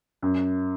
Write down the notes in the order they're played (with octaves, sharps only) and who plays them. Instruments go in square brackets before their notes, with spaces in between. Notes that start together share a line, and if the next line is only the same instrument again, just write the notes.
[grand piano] F#2